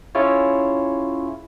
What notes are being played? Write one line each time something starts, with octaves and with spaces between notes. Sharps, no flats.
C#4 E4 F4 G#4 C#5